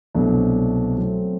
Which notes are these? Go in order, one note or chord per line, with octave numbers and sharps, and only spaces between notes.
C2 B2 F#3 A3 D4
F#3 A3 C4